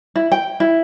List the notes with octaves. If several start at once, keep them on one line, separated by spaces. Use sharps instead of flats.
E4
G5
E4